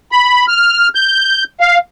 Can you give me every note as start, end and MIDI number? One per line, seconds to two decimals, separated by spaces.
0.12 0.45 83
0.48 0.88 89
0.95 1.44 91
1.60 1.78 77